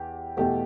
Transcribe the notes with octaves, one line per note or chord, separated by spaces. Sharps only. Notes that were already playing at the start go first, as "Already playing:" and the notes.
Already playing: E2 G4
E2 B2 A3 G4